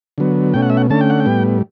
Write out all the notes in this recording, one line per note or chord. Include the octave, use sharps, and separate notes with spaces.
D3 F#3 B3
B2 A3 C#4 G5
F#5
E5
F#5
D3 A3 C#4 A5
G5
F#5
G5
A2 G3 B3